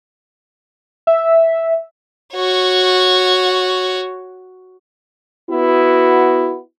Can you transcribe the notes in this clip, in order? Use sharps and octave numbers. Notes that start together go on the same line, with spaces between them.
E5
F#4 C#5
B3 E4 F#4